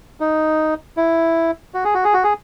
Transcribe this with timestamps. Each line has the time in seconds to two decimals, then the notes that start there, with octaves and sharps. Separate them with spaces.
0.20 D#4
0.97 E4
1.74 F#4
1.84 G#4
1.94 F#4
2.04 G#4
2.14 F#4
2.24 G#4